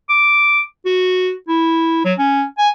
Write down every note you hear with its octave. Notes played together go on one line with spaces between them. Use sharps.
D6
F#4
E4
F#3
C#4
G#5